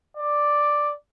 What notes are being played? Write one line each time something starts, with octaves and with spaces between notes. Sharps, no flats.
D5